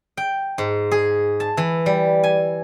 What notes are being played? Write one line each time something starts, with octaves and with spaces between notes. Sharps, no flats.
G5
G#2
G#4
A5
E3
G3
G#5